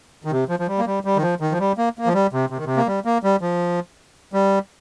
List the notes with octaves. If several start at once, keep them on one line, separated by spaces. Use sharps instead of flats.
D#3
C3
F3
F3
G3
A#3
G3
G3
D#3
F3
D#3
F3
G3
A#3
A#3
F3
G3
C3
C3
D#3
C3
A#3
G3
A#3
G3
F3
G3